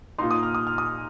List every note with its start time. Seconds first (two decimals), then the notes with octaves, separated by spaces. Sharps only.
0.18 A#2 A#3 D#4 C6
0.31 D#6
0.43 F6
0.55 D#6
0.67 F6
0.78 D#6